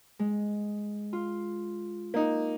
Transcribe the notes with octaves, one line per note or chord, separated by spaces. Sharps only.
G#3
F4
A#3 D#4